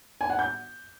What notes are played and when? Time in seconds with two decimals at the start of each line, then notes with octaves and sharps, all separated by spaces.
0.21 G#5
0.30 F#5
0.39 G6